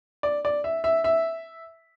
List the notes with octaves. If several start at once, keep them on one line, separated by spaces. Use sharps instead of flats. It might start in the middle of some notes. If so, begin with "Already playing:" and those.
D5
D5
E5
E5
E5